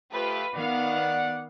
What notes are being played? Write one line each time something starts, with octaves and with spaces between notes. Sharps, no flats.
F3 A3 F4 G4 B4
D#3 B3 D5 F5 F#5